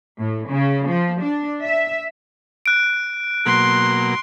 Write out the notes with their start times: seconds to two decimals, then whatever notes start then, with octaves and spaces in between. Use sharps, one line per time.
0.19 A2
0.49 C#3
0.87 F3
1.22 D4
1.64 E5
2.66 F#6 D7
3.46 B2 F#3 A#3 C6